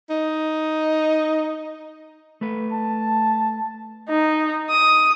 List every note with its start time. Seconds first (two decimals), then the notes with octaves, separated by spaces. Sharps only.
0.10 D#4
2.41 A3 B4
2.72 A5
4.09 D#4
4.69 D#6